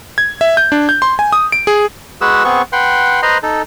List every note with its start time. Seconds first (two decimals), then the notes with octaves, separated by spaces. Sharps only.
0.18 G#6
0.41 E5
0.57 G6
0.72 D4
0.89 G6
1.02 C6
1.19 G#5
1.33 D#6
1.52 D7
1.67 G#4
2.21 G#3 F#4 G#4 B4 E6
2.44 B3 C4 G#4 C#6
2.72 B4 F#5 G5 C6
3.23 B4 C5 D#5 A#5 C6
3.43 D#4 A4